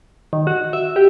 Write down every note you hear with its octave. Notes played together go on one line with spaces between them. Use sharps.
D#3
F#4
E5
G4